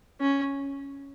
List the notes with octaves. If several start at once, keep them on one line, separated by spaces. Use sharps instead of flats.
C#4